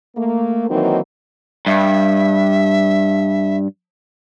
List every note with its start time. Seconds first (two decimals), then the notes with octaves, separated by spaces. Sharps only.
0.17 A3 A#3
0.69 D#3 E3 F#3 A#3 C4 D#4
1.66 G2 E5